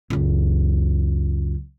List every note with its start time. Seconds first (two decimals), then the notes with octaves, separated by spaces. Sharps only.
0.10 C#2 F#2